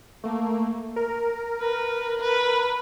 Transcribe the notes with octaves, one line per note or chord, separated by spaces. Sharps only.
A3 A#3
A#4
B4
B4